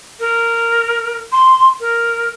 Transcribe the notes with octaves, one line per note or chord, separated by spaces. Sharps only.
A#4
C6
A#4